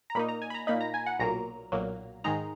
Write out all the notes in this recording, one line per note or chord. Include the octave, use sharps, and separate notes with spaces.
A#5
A#2 A#3 D#4 B5
A#5
G#5
B5
A#5
A#2 A#3 D#4 B5
A#5
G#5
F#5
B1 A#2 F#3 A#3 A#5
B1 A#2 F#3 A#3
G#2 D#3 G#3 D#4 A#5